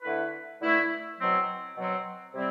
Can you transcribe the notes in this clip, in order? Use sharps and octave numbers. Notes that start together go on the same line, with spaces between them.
D3 A3 E4 B4
D3 A3 E4 B4
B2 F#3 C4
B2 F#3 C4
C3 G3 C4 E4